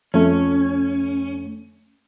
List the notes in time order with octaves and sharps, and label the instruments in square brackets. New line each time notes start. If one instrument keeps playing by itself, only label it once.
[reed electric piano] F2 A3 [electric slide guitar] C#4